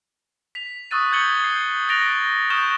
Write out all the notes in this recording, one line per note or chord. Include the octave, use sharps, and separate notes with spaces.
B6 F7
C#6 D#6 E6 F#6 A6 D#7
G6 G#6 C#7 F#7 G7
G6 C7
F#6 A6 A#6 D7 F7 G7
C#6 D#6 F6 G6 E7 G7